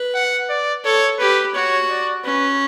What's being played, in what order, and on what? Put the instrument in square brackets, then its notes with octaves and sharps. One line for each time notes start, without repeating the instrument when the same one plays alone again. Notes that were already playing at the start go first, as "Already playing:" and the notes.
Already playing: [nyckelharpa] B4
[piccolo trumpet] F#5
D5
[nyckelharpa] A4 [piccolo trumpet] C#5
[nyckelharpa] G4 [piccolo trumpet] B4
[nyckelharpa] F#4 [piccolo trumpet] C#5
[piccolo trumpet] D5
[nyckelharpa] C#4 [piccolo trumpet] B4